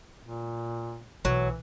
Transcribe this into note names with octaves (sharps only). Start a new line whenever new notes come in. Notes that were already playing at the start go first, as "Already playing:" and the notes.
A#2
B1 E3 F#3